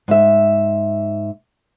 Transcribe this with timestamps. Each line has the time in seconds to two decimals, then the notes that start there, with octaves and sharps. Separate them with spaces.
0.08 G#2 E5